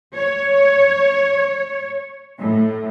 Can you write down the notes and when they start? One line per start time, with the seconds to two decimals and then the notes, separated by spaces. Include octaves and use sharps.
0.15 C#5
2.40 A2